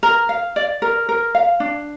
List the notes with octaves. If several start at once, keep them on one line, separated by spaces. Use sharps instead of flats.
A#4
F5
D5
A#4
A#4
F5
D4